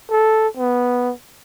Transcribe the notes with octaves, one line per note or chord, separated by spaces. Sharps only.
A4
B3